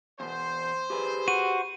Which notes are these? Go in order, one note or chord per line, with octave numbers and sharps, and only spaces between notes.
E2 B2 C5
G4 G#4 B4
F#4 D#7